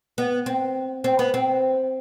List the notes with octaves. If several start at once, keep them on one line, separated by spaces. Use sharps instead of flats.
B3
C4
C4
B3
C4